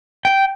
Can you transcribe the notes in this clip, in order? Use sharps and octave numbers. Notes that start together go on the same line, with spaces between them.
G5